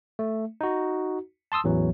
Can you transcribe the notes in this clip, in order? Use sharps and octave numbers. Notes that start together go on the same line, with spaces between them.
A3
D#4 F#4
A5 C6 D#6 E6
A1 E2 E3 F#3